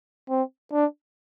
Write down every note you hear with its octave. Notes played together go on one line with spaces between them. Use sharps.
C4
D4